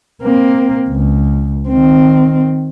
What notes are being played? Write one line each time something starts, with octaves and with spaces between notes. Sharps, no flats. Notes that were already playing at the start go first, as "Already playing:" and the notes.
A#3 C4
C#2
D#3 C4